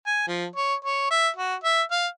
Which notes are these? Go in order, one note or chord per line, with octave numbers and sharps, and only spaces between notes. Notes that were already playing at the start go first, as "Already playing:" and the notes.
G#5
F3
C#5
C#5
E5
F#4
E5
F5